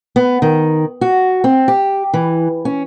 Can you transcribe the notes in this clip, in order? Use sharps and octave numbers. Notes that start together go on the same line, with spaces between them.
B3
D#3
F#4
C4
G4
E3
C#4